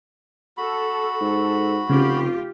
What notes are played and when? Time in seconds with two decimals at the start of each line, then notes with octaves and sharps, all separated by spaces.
0.57 F#4 A4 B5
1.21 G#2 A4
1.89 F1 C#3 F4 G4